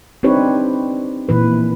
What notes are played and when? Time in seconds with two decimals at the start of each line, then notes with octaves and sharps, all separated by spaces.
0.23 C4 D4 D#4 G4 B4 C#5
1.29 A#2 E3 B4